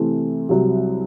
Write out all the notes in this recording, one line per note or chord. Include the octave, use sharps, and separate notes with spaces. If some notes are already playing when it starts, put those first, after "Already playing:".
Already playing: C3 E3 A3 C4
C2 C3 F#3